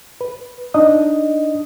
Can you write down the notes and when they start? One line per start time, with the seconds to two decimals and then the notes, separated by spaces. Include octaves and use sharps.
0.21 B4
0.74 D4 D#4 D#5 D#6